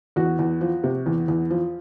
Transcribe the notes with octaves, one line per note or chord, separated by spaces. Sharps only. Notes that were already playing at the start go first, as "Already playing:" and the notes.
E2 F#4
E2
F3
C3
E2
E2
F3